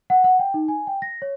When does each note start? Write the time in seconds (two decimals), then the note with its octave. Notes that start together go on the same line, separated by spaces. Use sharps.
0.10 F#5
0.24 F#5
0.39 G5
0.54 D#4
0.68 G#5
0.87 G5
1.02 A#6
1.22 C#5